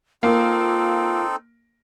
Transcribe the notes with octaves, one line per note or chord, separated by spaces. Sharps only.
A#3 C4 D#4 F4 A4